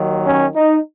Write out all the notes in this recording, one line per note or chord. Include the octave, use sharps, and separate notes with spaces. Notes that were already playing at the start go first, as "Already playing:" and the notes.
Already playing: D#2 D#3 F#3
C#4
D#4